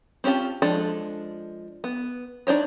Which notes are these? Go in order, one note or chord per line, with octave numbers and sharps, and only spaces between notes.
C4 C#4 F4 G4 A5
F3 G#3 D4 A4
B3
D4 D#4 C5 C#5